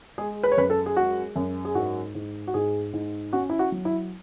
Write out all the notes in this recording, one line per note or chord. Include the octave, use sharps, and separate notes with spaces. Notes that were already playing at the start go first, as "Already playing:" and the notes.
G#3 G#4
B4
C#5
F#2 B4
A4
G#4
G#3 F#4
F#2
G#4
G#2 F#4
G#2
F#4
G#2 G#4
G#2
C#4 F#4
E4
F#4
F#3
E4